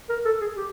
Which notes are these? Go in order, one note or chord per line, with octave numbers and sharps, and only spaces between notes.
A#4
A4
G#4
G4